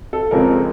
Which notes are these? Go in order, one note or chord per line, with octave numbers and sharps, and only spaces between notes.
A4
F2 C#3 F3 G#3 C4 A#4